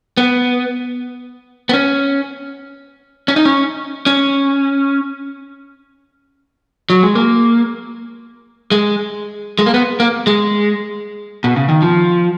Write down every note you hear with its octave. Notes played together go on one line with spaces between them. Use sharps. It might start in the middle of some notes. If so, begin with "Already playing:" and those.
B3
B3
C#4
C#4
D#4
C#4
C#4
F#3
G#3
A#3
G#3
G#3
A#3
B3
A#3
G#3
B2
C#3
D#3
F3